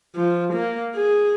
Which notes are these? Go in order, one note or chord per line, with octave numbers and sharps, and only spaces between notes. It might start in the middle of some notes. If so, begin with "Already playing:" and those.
F3
A#3
G#4